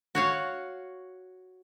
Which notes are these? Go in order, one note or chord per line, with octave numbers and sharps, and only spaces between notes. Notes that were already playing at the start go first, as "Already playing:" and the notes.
F#4 C#5 F5